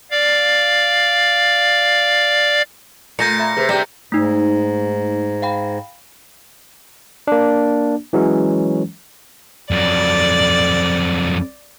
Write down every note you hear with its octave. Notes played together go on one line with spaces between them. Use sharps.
D5 F5
A#2 A3 A#5 G6 A#6 C#7
E5 A#5 B5
C3 G#4 B4 C5
C3 G3 D4 G4 D5 A#5
G#2 A3 D#4
F5 G5 B5
A#3 D4
E3 F#3 G#3 C#4
F2 F#3 D5